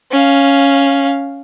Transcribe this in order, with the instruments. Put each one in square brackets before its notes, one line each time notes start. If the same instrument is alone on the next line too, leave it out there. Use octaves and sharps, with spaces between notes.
[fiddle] C#4 F5